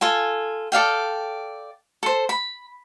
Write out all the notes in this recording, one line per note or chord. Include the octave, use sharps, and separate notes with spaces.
F4 A4 G#5
A4 D5 F5 G5
A4 C5
B5